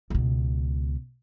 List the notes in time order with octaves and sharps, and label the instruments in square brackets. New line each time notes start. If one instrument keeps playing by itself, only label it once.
[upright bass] C#2 B2